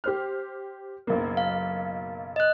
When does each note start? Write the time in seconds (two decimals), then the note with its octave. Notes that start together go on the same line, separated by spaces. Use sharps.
0.04 G4 C5 F6
1.07 F#1 B1 A#3
1.37 F5
2.36 D#5 F#6